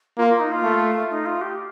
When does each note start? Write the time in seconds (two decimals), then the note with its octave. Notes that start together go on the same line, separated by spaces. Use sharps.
0.17 A#3 F4
0.29 F4
0.40 D#4
0.52 F4
0.63 A3
1.11 D#4
1.26 F4
1.41 G4